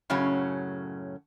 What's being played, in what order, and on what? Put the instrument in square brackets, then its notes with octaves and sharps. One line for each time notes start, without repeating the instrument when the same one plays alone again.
[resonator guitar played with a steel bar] F#2 A2 C#3 F#3 C#4